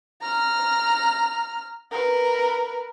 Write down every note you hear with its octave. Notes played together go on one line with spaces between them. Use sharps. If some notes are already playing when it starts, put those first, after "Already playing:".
A#5 F6
A#4 B4